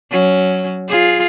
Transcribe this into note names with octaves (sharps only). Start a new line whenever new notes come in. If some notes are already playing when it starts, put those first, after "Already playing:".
F#3 C#4
F4 G#4